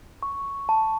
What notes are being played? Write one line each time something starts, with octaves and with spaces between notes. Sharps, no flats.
C#6
A5